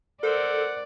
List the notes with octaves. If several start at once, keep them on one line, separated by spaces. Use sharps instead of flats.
A4 A#4 C5 D5 F#5